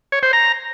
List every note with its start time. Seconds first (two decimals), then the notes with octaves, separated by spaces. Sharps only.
0.12 C#5
0.23 C5
0.33 A#5